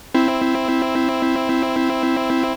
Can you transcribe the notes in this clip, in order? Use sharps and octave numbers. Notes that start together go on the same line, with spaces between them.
C4 E4